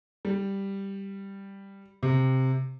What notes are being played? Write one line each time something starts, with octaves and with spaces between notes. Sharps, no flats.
G3
C3